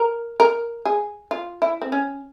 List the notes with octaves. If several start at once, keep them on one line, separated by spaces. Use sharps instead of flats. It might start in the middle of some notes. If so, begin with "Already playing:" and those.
Already playing: A#4
A#4
G#4
F4
E4
C4
C#4